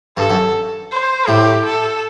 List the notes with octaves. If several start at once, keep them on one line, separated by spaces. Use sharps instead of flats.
G2 A4
F#2
C5
A2 G4
A4